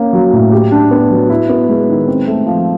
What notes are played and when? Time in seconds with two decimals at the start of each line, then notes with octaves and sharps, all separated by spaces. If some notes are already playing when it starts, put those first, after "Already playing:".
Already playing: A#3 C#4
0.13 F#3
0.33 A2
0.52 G4
0.72 D4
0.91 B3
1.10 F#3
1.30 E4
1.49 B3
1.69 G#3
1.89 D#3
2.07 C4
2.27 A3
2.46 F3